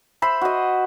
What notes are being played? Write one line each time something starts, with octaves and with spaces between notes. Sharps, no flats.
C5 E5 B5 C6
F#4 D#5